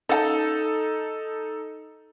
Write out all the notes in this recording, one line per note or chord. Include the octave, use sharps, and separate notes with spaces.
C#4 D#4 A4 F#5 A5